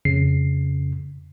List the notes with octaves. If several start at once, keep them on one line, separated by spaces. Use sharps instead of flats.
F2 C#3 C7